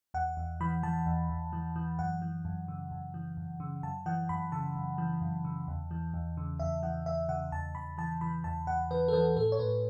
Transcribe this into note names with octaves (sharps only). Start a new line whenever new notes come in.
E2 F#5
E2
E3 B5
E3 A5
E2
E2
E3
E3
F#2 F#5
E3
F#2
C#3
F#2
E3
F#2
C#3
F#2 A5
E3 F#5
F#2 B5
C#3 A5
F#2
E3
F#2
C#3
E2
E3
E2
C#3
E2 E5
E3 F#5
E2 E5
C#3 F#5
E2 A5
E2 B5
E3 A5
E3 B5
E2 A5
E2 F#5
E3 B4
A4
E3 B4
A2 A4
C#5
A2 B4